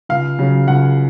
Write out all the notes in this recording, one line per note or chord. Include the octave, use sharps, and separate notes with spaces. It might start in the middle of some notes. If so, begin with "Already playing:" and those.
C#2 F5
C#3 F#3
C#2 F#5